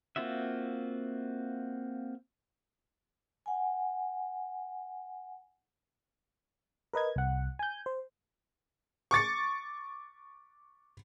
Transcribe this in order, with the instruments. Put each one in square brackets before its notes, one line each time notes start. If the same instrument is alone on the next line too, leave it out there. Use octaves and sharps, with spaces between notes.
[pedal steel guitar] A#3 C4 F4 F#4 E5
[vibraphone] F#5 G#5
[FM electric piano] A#4 B4 D#5 G#6
C2 F#5
G#5 G6
C5
[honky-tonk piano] C#6 D6 A6 C#7